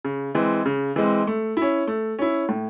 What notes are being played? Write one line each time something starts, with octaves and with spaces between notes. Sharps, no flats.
C#3
E3 G#3 C4
C#3
E3 G#3 C4
A3
C#4 E4
A3
C#4 E4
A2